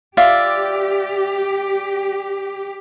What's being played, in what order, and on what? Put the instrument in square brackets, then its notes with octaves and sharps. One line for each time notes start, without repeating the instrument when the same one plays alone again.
[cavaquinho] F4 D5 E5 [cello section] G4